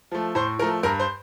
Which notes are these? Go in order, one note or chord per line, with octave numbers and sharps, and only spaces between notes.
F3 A3
A2 C5
F3 A3 A#4
G2 A#4
C5